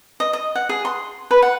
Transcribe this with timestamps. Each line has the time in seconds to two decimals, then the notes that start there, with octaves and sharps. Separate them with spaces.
0.20 D#5
0.33 D#5
0.55 F#5
0.69 G#4
0.85 C6
1.31 B4
1.42 F#5